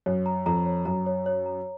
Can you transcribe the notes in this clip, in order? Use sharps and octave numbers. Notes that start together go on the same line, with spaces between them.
F#2 C#5
A#5
F2 A#5
C#5
F#2 A#5
C#5
C#5
A#5